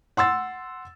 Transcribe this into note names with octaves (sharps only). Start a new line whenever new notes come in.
F#5 C6 E6 A6